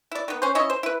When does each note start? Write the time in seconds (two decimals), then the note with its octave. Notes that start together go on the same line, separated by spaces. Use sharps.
0.12 E4 D5
0.28 D#3 B3
0.42 C#4 C5
0.55 C#4 E4 C#5 D#5
0.70 C5
0.83 E4 B4